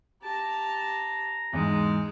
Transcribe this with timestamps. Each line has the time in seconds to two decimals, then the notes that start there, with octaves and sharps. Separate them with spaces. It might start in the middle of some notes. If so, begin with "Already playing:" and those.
0.23 G4 A5 A#5
1.53 E2 G#2 G#3 G#4